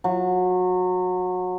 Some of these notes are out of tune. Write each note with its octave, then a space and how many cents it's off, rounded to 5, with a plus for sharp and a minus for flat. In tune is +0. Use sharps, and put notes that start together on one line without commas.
F#3 -25